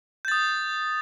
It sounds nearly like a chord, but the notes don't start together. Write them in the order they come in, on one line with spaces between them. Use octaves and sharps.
G6 A6 D#6